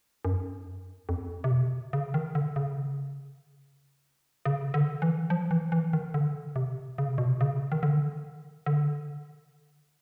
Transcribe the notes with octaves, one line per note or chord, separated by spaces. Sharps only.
F#2
F2
C3
B2
C#3
D#3
D3
C#3
C#3
D3
E3
F3
E3
E3
D#3
D3
C3
C#3
C3
B2
C3
C#3
D#3
D3
D3